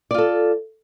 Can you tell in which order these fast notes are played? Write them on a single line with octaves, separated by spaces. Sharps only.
D5 F4 A4